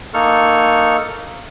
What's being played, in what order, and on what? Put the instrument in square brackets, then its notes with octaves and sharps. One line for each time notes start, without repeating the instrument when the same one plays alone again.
[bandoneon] A#3 D#4 A4 C#6 F6